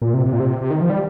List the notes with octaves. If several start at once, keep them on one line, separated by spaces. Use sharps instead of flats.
A#2
C3
C3
A#2
C3
C3
D#3
F3
G3